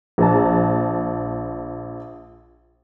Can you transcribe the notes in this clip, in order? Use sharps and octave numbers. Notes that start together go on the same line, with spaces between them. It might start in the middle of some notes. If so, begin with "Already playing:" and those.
A#1 A5